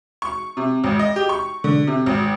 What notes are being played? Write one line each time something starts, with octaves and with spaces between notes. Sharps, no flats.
C#6
C3
G#1
D#5
G4
C#6
D3
C3
G#1